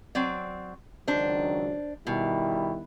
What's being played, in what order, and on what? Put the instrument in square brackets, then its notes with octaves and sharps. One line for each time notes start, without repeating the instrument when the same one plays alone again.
[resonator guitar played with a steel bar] F#3 C4 D5
[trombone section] C#2 D#3 F#3 [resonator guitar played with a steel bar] D4 C5
[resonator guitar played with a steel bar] B2 [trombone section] D#3 G3 E4